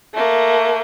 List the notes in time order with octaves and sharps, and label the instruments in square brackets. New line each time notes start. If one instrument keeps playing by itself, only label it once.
[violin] A3 A#3